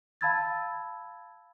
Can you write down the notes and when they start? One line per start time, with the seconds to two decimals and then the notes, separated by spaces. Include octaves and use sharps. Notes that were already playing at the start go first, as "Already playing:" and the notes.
0.21 F5 A5 B5 E6 G#6 A6